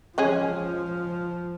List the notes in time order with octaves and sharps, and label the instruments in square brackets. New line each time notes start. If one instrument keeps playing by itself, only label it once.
[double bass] F3 [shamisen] G#3 C#4 G#4